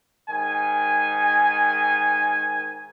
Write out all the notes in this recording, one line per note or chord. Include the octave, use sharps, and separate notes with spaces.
G#2 D#3 G#5